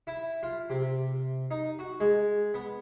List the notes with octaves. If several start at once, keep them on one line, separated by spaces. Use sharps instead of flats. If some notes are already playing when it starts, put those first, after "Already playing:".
E4
F4
C3
D#4
F#4
G#3
B3